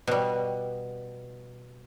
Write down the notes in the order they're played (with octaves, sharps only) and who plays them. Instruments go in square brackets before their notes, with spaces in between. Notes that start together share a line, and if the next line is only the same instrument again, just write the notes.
[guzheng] B2 G3